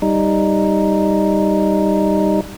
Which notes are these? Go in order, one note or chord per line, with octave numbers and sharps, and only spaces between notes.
G3 D#4